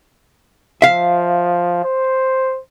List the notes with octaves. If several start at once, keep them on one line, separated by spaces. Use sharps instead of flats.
F3 E5 F5
C5